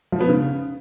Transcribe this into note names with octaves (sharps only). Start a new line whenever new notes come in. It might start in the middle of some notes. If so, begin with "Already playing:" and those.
F3
B3
C#3